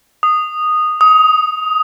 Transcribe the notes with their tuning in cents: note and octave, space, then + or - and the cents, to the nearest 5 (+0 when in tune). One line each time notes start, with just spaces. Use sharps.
D#6 -10
D#6 +20